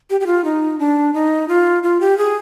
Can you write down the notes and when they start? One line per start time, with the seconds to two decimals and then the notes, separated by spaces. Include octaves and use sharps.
0.10 G4
0.21 G4
0.27 F4
0.44 D#4
0.79 D4
1.14 D#4
1.48 F4
1.83 F4
2.01 G4
2.18 G#4